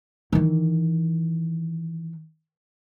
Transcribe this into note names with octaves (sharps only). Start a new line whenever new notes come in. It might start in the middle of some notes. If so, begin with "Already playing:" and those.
D#3 E3